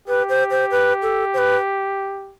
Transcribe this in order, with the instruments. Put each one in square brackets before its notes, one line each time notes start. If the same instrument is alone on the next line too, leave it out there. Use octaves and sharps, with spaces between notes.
[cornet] G4 [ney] B4
[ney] C5
C5
B4
A4
C5
B4